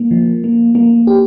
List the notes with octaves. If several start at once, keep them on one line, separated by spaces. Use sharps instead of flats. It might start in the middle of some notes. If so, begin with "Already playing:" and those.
Already playing: A#3
F3
A#3
A#3
G4